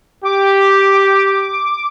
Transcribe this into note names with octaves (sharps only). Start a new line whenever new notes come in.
G4 D6